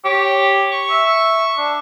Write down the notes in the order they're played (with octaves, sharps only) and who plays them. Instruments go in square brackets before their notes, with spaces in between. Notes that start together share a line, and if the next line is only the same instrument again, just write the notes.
[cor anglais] G4 [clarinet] C#5
[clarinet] C#6
[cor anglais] E5
D4